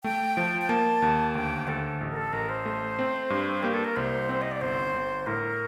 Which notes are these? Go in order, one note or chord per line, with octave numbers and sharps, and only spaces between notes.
A3 G5
F3
G5
A#3 A5
D#2
D2 G5
D2 A4
A1
A#4
A4
A1 A#4
C5
A3
C4
G2
A#3 G4
A4
A#4
C2 C5
C4
D#5
D5
G1 C5
G1
A2 A#4